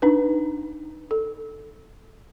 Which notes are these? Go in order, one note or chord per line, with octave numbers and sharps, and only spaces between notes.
D4 D#4 B4
A4